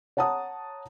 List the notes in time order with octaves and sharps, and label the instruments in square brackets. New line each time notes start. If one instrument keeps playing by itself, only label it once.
[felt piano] C#5 F#5 A5 A#5 D#6